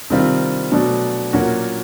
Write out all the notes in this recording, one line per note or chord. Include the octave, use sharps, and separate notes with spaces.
C3 D#3 G3 C4 F4
B2 F#3 A3 D4
A#2 F#3 A#3 C#4 F#4